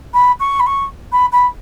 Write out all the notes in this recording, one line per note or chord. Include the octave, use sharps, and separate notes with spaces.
B5
C#6
B5
C#6
B5
B5